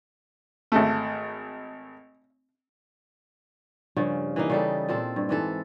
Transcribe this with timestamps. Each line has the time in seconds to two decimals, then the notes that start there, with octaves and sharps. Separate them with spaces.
0.72 G#1 A3
3.97 G2 C#3 F3
4.36 E3 A#3 D#4
4.50 C#3 G3 A4
4.89 A#2 C4 A4
5.16 G2
5.29 G#2 E3 A4